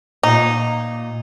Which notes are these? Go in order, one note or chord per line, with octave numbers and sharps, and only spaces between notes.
A#2 D#4